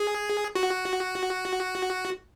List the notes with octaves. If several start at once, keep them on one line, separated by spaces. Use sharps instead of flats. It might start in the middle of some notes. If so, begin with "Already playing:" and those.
Already playing: G#4
F#4